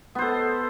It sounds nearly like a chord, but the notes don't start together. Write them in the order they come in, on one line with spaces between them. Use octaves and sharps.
B3 C5 A4